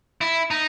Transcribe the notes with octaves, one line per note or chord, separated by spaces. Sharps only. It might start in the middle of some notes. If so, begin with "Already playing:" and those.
E4
D#4